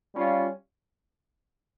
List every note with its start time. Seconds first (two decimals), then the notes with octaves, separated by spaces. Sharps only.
0.15 G3 C#4 F4